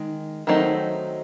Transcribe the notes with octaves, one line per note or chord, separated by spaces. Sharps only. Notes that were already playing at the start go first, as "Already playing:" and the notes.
Already playing: D#3 G#3
D#3 F#3 A3 C4 D#4